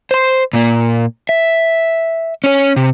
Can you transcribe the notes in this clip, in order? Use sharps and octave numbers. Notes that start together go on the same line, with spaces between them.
C5 C6
A#2 A#3
E5
C#4 C#5
C3